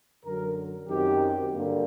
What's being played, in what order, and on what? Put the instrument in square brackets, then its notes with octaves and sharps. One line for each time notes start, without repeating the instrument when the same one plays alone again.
[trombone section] F#2 D3 F#3 A#4
F#2 D#3 F#3 C4 G4
G2 D3 G3 A#3